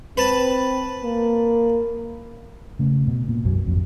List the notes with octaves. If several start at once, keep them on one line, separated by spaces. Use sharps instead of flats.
C4 B4 A5
A#3
C#3 A3
B2
A#2
B1 F#2 F#3
G#1 F2